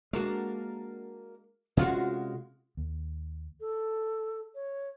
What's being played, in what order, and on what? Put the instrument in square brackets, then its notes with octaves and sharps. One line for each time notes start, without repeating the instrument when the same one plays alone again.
[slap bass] G#3 [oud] A#3 D4 F#4
[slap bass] C3 C#4 [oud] G#3 F4 F#4
[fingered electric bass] D#2
[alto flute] A4
C#5